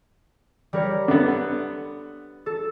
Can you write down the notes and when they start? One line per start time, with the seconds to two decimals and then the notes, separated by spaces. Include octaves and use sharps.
0.73 G3 A#4 C#5
1.08 D3 B3
2.46 A4